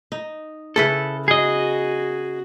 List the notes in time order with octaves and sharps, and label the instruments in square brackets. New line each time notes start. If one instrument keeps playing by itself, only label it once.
[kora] D#4
[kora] C#3 E4 B4 [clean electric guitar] A4
[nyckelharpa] F#4 [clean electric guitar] G#4 D#5